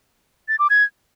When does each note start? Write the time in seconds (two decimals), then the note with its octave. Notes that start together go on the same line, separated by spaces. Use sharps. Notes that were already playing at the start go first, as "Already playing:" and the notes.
0.48 A6
0.59 D6
0.70 G#6